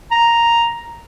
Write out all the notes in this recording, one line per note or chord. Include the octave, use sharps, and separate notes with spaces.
A#5